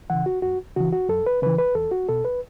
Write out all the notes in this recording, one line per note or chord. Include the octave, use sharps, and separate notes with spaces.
C#3 E3 F#5
F#4
F#2 F#4
C#3 E3 F#4
F#4
F#2 A4
B4
C#3 E3 B4
B4
E2 A4
F#4
B2 A4
B4